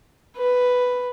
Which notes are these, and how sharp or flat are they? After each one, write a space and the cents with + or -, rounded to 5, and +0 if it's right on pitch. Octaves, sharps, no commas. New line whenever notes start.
B4 +5